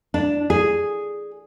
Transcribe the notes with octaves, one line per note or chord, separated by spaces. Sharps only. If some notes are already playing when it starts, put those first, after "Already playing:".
D4
G#4